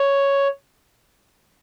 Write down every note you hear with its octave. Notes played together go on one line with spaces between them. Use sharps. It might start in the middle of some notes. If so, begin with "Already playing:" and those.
Already playing: C#5